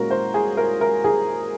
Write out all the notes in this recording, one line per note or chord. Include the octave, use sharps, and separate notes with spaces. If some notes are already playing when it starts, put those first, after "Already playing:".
Already playing: A#2 G#3 C#4 F#4 A#4
C5
G#4
A#4
A#4
G#4